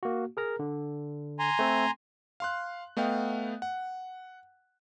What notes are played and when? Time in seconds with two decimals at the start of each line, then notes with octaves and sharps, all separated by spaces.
0.03 A#3 F#4
0.37 G#4 A#4 A#5
0.59 D3
1.39 G#5 A#5 C6
1.59 A3 C4 A4
2.40 F5 C6 F#6
2.97 A3 B3 D#5 F5 G5
3.62 F#5